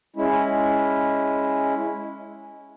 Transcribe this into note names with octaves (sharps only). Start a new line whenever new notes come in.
G#3 C#4 E4